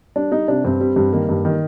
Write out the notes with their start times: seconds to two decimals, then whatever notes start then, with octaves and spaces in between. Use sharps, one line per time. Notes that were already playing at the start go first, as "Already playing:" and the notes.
0.16 G3 D4
0.32 G3 D#4
0.48 C3 D4
0.65 G2 C4
0.80 G3
0.96 G2
1.13 D#3 A#3
1.29 G2
1.45 D#3